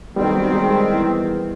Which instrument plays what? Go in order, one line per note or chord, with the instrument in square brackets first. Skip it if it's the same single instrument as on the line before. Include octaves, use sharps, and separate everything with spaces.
[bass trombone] B1 [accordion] D#3 C4 [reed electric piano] G3 B3
[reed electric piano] G3 [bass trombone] G#3
[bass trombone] E2